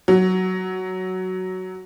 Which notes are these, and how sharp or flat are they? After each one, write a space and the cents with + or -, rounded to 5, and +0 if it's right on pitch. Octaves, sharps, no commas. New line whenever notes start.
F#3 +5